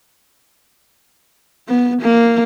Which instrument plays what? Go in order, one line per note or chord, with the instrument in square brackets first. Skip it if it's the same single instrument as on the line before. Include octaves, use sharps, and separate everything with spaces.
[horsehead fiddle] B3
A#3